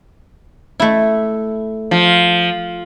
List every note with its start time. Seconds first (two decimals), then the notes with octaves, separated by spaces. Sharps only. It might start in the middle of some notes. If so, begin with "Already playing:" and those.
0.80 A3 E4
1.91 F3